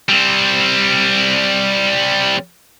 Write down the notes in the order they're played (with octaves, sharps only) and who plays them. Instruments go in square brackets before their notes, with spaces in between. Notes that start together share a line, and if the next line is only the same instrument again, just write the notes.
[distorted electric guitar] G3 C4